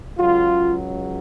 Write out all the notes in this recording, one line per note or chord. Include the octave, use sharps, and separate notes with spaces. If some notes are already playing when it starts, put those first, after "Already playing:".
C#2 C#3 F#3 F4